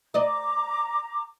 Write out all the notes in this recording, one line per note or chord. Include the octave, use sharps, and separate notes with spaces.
D5 D#5 A#5 D6